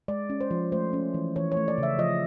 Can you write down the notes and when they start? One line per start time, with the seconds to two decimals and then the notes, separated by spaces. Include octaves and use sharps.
0.08 G#3 D5
0.30 C#4
0.41 C5
0.51 F3
0.72 A3 C5
0.93 C#4
1.14 E3
1.36 E3 C#5
1.52 C#5
1.57 A3
1.68 D5
1.78 C#3 E5
1.99 F3 D#5